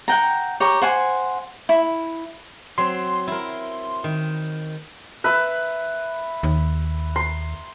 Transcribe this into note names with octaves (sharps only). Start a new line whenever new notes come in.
F#5 G5 A#5
G4 C#5 A#5
C5 F#5 G#5 C6
E4
F#3 C4 C6
E4 A#4
D#3
B4 E5
D#2
C6